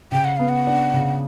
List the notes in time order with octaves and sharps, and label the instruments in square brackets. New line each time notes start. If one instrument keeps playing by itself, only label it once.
[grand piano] C#3 [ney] G5
[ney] F#5
[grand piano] B3 [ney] F5
[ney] F#5
[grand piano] D4
C#3